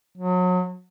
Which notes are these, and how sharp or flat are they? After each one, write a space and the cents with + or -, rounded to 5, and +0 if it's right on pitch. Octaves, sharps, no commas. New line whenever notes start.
F#3 -30